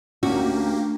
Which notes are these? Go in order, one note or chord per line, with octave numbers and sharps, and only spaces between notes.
D2 A#3 C#4 F#4 G4